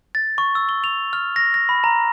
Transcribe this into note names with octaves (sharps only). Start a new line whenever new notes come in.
A6
C#6
E6
G7
F7
F6
A#6
A#6
B5
A#5